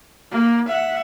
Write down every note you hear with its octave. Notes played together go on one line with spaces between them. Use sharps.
A#3
E5 F#5